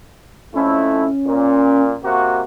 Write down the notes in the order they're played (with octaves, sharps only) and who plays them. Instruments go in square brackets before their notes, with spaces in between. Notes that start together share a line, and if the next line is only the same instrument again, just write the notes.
[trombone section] F2 A3 E4 [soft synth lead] C#4
[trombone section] A#2
C3 A#3 F#4